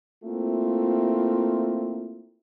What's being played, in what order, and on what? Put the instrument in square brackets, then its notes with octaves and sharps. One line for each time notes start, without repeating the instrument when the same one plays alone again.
[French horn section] A3 A#3 C4 E4 F4